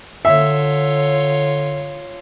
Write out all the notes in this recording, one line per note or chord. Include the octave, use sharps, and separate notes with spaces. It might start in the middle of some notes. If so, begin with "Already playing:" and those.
D3 F4 C#5 E5